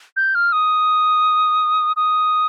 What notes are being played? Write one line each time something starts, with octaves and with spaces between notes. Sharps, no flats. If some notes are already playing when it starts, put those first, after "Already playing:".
G6
F6
D#6
D#6